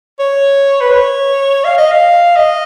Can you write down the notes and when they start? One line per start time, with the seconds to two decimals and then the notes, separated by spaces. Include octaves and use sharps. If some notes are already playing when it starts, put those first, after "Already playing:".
0.19 C#5
0.81 B4
0.92 C#5
1.64 F5
1.78 D#5
1.91 F5
2.36 D#5